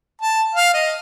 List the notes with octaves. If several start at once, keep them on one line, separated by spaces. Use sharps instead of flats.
A5
F5
D#5